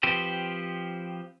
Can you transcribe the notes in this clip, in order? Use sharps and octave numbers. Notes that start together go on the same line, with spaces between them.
F3 C4 G4 B4 C5